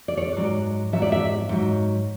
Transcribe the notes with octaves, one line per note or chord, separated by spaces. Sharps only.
D5
C#5
D5
G#2 F#3
G#2 F#3 E5
D5
E5
G#2 F#3